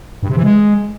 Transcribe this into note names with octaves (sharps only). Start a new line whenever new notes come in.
G2
C3
E3
G#3